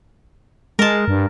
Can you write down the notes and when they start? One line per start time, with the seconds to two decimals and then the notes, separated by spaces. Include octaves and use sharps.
0.79 G#3 A#4 A5
1.08 G2